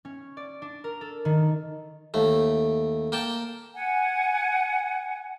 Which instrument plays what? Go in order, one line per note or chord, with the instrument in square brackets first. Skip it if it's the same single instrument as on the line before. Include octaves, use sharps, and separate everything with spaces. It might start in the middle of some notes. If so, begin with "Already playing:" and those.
[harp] C#4
D5
D4
A#4
A4
D#3
[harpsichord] D#2 A3
A#3 G5 A5
[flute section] F#5 G#5